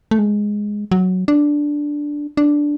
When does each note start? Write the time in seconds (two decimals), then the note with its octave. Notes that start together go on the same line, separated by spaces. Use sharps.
0.11 A3
0.19 G#3
0.91 F#3
1.28 D4
2.37 D4